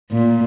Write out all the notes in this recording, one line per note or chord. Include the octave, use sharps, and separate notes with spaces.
A#2